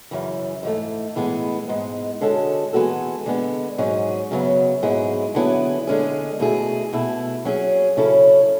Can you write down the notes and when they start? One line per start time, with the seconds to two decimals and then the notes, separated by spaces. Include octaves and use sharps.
0.11 F#2 C#3 E3
0.63 G#2 E3 A3
1.16 A2 E3 G#3 B3
1.68 G#2 G#3 B3
2.21 D3 G#3 C#4 F#4 A4
2.73 E3 G#3 B3 F#4 A4
3.26 D3 G#3 B3
3.78 G#2 F#3 C#4 G#4
4.31 F#2 C#3 F#3 B3
4.83 G#2 F#3 B3 E4 G#4
5.35 D3 F#3 B3 E4 G#4
5.87 D3 G#3 C#4 G#4
6.40 B2 A3 E4 G#4
6.93 B2 A3 E4
7.45 F#3 C#4 G#4
7.97 C#3 F#3 C#4 E4 A4